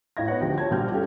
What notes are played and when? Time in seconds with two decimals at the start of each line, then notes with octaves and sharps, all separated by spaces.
0.17 A2 F4 D#5 G#6 A#6
0.28 B3 D#4 C#5 F#5
0.41 D2 F3 G4 G5
0.58 C#5 A5 G#6
0.71 A#1 A#2 G3 F#4 F6 G6
0.92 G3 C#4 G4 A4